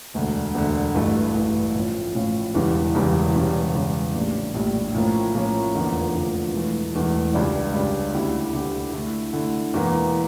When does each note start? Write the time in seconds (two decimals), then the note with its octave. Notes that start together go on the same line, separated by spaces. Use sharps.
0.14 E1 D2 D3
0.54 E1 D2 D3
0.94 A1 G2 E3 A3
1.34 A1 G2 E3 A3
1.75 A2 F3 C#4 F4
2.15 A2 F3 C#4 F4
2.54 E1 E2 C#3 E3 G3
2.94 E1 E2 C#3 E3 G3
3.35 E1 E2 C#3 G3 C#4
3.74 E1 E2 C#3 G3 C#4
4.15 A#1 A2 G3 D4
4.55 A#1 A2 G3 D4
4.95 A2 F3 A#3 C#4
5.34 A2 F3 A#3 C#4
5.74 F1 E2 D3 F3 A#3
6.14 F1 E2 D3 F3 A#3
6.53 E1 E2 E3 A3
6.94 E1 E2 E3 A3
7.34 C#2 C#3 G3 D4
7.73 C#2 C#3 G3 D4
8.14 D2 D3 A3 E4 G4
8.53 D2 D3 A3 E4 G4
8.93 D3 A3 E4
9.33 D3 A3 E4
9.74 E1 E2 E3 A#3